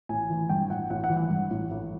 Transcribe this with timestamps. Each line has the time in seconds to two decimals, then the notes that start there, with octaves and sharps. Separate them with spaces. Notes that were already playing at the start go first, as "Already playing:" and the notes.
0.09 A1 G#5
0.30 E3
0.49 G2 G5
0.70 A1 F#5
0.90 A1 F#5
1.04 F#5
1.09 E3
1.17 F#5
1.30 G2
1.50 A1
1.71 A1